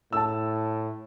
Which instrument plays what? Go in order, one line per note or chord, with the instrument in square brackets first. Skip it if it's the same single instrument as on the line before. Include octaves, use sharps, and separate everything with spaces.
[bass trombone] A2 [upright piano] A5 E6